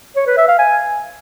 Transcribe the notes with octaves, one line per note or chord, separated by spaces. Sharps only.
C#5
B4
E5
F5
G#5